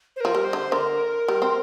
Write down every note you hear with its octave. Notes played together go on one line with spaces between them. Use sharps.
C5
F3 A#4
G3
C5
D3
D3 A#4
G3
C4